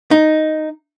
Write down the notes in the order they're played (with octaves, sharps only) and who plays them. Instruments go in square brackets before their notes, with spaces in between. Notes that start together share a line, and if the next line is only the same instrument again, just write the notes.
[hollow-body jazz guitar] D#4